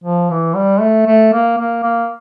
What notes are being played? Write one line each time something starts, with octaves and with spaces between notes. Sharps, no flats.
F3
E3
G3
A3
A3
A#3
A#3
A#3